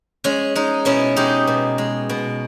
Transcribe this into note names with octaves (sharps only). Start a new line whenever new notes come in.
G#3 C#4
G#3 D#4
B2 C#4 E4
G#3 D#4 G4
B2
G#3
B2